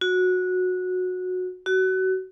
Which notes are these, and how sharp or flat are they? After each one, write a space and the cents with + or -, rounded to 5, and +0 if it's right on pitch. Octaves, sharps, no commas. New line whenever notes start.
F#4 -15
F#4 +25